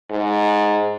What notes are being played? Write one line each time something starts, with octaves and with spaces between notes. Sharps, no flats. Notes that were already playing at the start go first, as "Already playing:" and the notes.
G#2